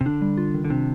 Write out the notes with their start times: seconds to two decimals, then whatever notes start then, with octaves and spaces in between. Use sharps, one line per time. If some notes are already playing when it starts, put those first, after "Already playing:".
0.01 C3
0.06 D3 D4
0.22 G3
0.37 F4
0.54 D#3
0.65 D3
0.70 C3 D4